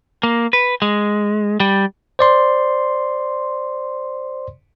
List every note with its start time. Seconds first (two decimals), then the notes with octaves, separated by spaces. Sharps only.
0.23 A#3
0.53 B4
0.82 G#3
1.60 G3
2.19 C5 D5 C6